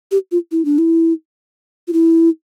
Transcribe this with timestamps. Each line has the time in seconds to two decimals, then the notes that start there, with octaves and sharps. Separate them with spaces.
0.12 G4
0.32 F4
0.52 E4
0.65 D4
0.78 E4
1.88 F4
1.93 E4